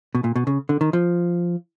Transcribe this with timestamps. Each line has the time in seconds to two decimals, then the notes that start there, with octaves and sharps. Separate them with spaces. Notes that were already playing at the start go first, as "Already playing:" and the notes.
0.15 B2
0.24 A#2
0.36 B2
0.47 C#3
0.69 D3
0.81 D#3
0.93 F3